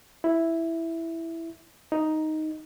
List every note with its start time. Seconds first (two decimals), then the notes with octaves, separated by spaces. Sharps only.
0.24 E4
1.92 D#4